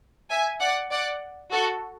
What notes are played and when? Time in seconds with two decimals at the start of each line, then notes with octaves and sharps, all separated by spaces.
0.30 E5 G#5
0.60 D5 F#5
0.91 D5 F#5
1.51 F#4 A4